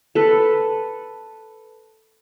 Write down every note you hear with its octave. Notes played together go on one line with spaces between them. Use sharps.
A4 B4